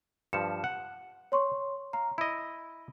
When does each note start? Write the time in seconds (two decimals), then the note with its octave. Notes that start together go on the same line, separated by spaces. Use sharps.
0.33 G2 F3 C#7 E7
0.64 F#5
1.32 C#5 C6 C#6
1.93 F5 A#5
2.18 E4 D#5 B5